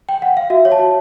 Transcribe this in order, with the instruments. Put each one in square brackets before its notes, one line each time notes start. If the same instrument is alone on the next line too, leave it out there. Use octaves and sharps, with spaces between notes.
[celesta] G5
F#5
F5
F#4 E5
C#5
A5
F#4